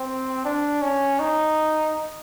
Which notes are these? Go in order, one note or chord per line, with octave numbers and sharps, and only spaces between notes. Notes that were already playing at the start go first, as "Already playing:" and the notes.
Already playing: C4
D4
C#4
D#4